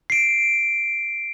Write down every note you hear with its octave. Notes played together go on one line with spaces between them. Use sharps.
C7 D7